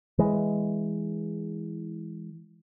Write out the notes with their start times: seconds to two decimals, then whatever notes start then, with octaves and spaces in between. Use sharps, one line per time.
0.19 E3 G#3